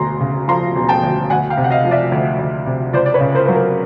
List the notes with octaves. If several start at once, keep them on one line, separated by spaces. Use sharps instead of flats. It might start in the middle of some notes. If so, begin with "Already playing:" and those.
Already playing: E1 D2 A#5 C6
C#3
F3 A#5 C6
E1
G5 A5
D2
D2 F#5 G#5
F5 G5
C3
F#5
D#5 F5
F3
D5 E5
D2
D2
C3
C#2 C5 D5
D5
B4 C#5
C#3
A#4 C5
F#3 B4
A#4 C5